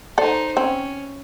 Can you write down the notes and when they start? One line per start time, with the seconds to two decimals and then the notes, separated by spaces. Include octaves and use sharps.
0.18 D#4 A4 C5 D5
0.57 C4 C#4